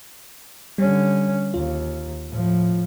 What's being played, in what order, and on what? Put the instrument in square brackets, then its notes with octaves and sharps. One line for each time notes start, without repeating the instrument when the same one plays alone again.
[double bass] D3 C#4 [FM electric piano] G3
[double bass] D#2 [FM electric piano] F4
[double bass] A2 F3